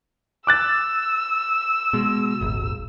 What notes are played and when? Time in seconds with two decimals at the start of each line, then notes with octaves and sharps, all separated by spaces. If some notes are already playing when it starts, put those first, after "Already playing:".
0.47 D6 E6 F#6 A6
1.93 B2 G#3
2.41 D#1 G#1